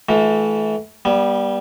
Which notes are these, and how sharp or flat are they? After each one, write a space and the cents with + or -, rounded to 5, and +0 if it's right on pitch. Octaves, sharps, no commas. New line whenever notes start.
E3 -30 A3 -35 F4 +35
G3 +0 B3 -35